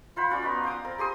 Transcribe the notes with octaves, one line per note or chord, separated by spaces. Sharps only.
F4 C5 F#5 B5
C#4 F4 F#4 D5
B3 D#4 B4
C5 F5 D6 D#6
C4 A#4
G4 G#4 C6 D#6